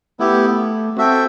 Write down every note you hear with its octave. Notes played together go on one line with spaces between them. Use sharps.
A3 B3 E4 G4
C4 F#4 A4 E5 G5